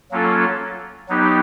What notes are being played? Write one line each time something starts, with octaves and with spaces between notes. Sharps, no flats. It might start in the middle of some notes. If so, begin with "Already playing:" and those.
F#3 A#3 C#4 F4 A4
F#3 B3 D#4 G4